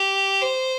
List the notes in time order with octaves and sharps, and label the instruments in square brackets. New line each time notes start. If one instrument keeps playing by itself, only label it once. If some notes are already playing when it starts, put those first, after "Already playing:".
Already playing: [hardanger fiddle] G4
C5